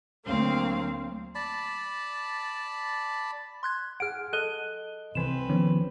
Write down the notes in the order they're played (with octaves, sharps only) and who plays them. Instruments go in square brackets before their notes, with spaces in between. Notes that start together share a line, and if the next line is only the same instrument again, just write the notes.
[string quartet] D2 F#3 A#3 C4 F5
[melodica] D5 A5 B5
[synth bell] C6 F#6 G#6
[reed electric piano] G#4 F#5 [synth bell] F6 D7
[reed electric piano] A4 D#5 [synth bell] F#6 D#7 G7
[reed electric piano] C2 [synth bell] E3 E7 [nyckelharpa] C4 B4
[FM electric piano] D#3 F3 B3 [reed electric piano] C#4